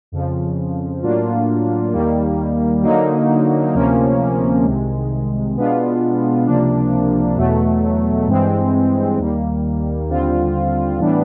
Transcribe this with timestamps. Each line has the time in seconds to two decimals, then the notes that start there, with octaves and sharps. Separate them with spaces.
0.12 F2 C#3 F3
1.03 A2 F#3 A#3 D4 F4
1.93 D#2 D#3 G3 A#3
2.83 D3 F#3 A#3 D#4
3.74 D2 C3 F3 A#3 C#4
4.64 C2 C3 D#3 G#3
5.56 B2 G#3 B3 D4 F4
6.47 C#2 C3 F3 A#3 D4
7.36 E2 B2 F#3 A3
8.27 G2 E3 G#3 C4
9.18 D#2 D#3 G3 A#3
10.09 D#2 D3 G3 C4 F4
10.99 A2 E3 G3 B3 D4